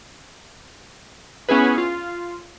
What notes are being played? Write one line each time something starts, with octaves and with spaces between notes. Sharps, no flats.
B3 C#4 E4 G#4 B4
F4